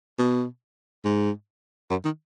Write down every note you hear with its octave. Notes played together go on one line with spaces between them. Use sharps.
B2
G#2
F#2
D#3